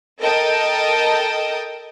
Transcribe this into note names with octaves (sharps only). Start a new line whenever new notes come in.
A4 A#4 D#5 G5 A5 D#6